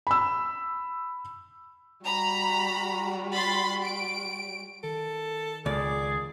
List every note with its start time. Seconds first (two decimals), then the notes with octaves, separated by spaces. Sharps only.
0.07 B5 E6
2.04 G3 F#4 A#5 B5
3.32 B5 C6 A6
3.85 D7
4.84 D#3 A4
5.66 C#2 G#4 D5